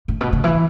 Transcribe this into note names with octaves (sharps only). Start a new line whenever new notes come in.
A2
B2
C#3
E3